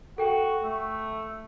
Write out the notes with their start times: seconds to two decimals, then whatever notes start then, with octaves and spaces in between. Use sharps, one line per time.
0.18 F#4 A4 G5
0.63 A3